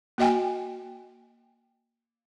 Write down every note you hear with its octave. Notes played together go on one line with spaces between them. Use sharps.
A#3 F#4 D#5 G5 G#5